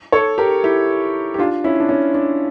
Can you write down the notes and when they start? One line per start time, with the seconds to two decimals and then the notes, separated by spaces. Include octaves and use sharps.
0.12 A4 C#5
0.38 G4 A#4
0.64 E4 G4
1.34 G4
1.39 D4 F4
1.64 C#4 E4
1.80 D4
1.89 C#4
2.15 D4